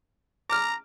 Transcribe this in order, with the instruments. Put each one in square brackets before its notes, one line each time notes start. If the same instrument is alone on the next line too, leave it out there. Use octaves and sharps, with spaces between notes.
[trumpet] A#5 [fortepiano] D6 F6